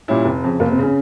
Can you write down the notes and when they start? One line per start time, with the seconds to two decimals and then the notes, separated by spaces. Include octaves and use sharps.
0.08 A#2 G3 C#4 E4
0.25 F1
0.44 F2 C#3
0.60 F1 A#3
0.72 C4
0.78 C#3 C#4